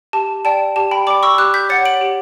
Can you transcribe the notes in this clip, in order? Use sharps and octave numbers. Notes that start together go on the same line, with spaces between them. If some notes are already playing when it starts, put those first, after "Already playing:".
G4 A5
D5 G5 A5
G4 A5
G5 B5
D5 G5 B5 D6
C#6 E6
G4 D6 F#6
G6 B6
C#5 F#5 A6 C#7
D7 F#7
G4